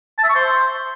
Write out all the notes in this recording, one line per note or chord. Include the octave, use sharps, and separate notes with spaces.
A5
E5
C#6
C5